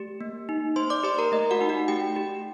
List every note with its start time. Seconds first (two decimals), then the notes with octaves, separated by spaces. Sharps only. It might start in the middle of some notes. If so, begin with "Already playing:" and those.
Already playing: A3 G4
0.21 A#3
0.49 D#4
0.76 A#3 C5 C6
0.90 D5 D6
1.04 G4 C5 C6
1.18 A#4 A#5
1.32 A3 D#5
1.51 F#4 F#5
1.61 D#4
1.69 F#4 F#5
1.88 A3 G4 G5
2.16 G4